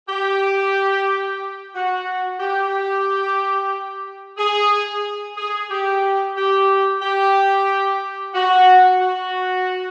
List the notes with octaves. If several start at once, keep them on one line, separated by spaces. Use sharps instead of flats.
G4
F#4
G4
G#4
G#4
G4
G4
G4
F#4
F#4